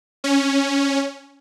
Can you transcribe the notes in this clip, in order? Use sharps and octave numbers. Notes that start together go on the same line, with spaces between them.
C#4